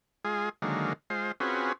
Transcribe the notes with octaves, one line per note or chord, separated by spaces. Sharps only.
G#3 F4 G#4
D3 D#3 F#3 G#3 A#3
G#3 F4 C5
C4 C#4 F4 F#4 G#4 B4